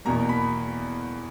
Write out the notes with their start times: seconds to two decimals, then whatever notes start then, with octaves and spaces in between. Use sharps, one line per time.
0.05 E2 B2 A#3 A#5
0.29 B5